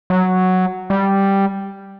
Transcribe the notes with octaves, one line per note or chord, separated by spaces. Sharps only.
F#3
G3